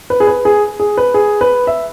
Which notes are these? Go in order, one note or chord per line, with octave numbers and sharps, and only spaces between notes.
B4
G#4
B4
G#4
G#4
B4
G#4
B4
E5